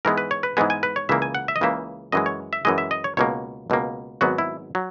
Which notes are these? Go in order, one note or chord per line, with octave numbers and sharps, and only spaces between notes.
G#2 E3 G#3 B3 A#4
B4
C#5
B4
G#2 E3 G#3 B3 G#5
G#5
B4
C#5
C#2 C#3 E3 A#3 E5
G#5
F#5
E5
D#5
C#2 C#3 E3 A#3 E5
F#2 E3 G#3 D#5
C#5
E5
F#2 E3 G#3 D#5
E5
D#5
C#5
C#2 B2 A#3 C#5
C#2 B2 A#3
G#1 G#2 F#3 B3 F#4
E4
F#3